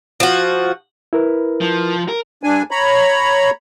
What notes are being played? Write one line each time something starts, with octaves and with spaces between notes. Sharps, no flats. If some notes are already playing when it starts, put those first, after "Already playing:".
F3 F#4
E4 A#4 B4
F3
A#4
G2 D4 G#5
C#5 A#5 B5